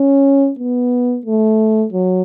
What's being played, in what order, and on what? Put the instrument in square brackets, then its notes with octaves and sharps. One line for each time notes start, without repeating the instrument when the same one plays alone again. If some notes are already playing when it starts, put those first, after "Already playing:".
Already playing: [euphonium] C#4
B3
A3
F#3